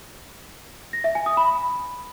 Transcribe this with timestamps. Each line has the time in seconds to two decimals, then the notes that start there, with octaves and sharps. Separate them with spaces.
0.93 A#6
1.04 E5
1.15 G#5
1.26 D#6
1.37 B5